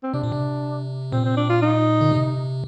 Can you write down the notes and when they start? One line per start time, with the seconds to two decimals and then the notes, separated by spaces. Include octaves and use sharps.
0.03 C4
0.14 C3 D4
0.23 A#2
0.32 C3
1.12 A#2 C4
1.25 C4
1.37 D4
1.50 F4
1.62 D#4
2.01 D3
2.12 C3